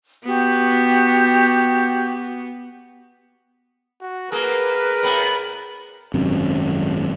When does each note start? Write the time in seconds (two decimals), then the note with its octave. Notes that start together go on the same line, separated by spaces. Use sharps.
0.25 B3 F#4 G4
4.01 F#4
4.32 A#3 G#4 A#4 B4
5.03 A2 B3 B5
6.14 G#1 F#2 C3